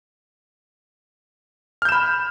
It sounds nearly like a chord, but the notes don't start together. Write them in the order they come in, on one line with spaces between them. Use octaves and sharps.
F6 G6 E7 B5